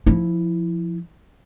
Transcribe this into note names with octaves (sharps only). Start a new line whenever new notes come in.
F3 E4